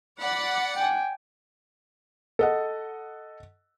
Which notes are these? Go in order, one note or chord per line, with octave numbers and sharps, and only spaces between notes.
D5 F#5 B5
G5 G#5
A4 D#5 F#5